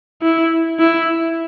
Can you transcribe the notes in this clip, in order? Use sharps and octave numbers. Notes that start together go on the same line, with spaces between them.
E4
E4